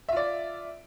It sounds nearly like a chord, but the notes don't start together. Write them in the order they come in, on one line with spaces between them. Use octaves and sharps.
E5 F4 D5